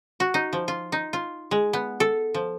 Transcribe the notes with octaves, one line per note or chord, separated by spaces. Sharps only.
F#4
D#4
F3
F4
D#4
F4
G#3
B3
A4
F3